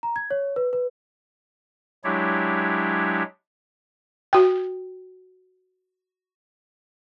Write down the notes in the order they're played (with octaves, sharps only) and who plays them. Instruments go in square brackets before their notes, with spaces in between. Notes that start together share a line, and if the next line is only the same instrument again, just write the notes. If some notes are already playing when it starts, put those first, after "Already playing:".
[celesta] A#5
G#6
C#5
B4
B4
[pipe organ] F#3 G#3 D4 E4 G4 C#5
[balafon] F#4 G5